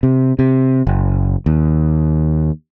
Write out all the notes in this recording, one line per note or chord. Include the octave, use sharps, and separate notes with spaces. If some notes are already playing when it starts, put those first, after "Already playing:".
C3
C3
F#1
D#2